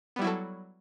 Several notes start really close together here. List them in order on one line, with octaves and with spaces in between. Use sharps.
B3 G3 E4 F#3 A4